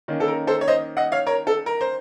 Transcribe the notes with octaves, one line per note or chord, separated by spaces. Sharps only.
D#3 A#3 C#4
A4
A#4
A4 C5
C#5
C5 D#5
D#5 F#5
C#5 F5
A#4 C#5
A4
A#4
C5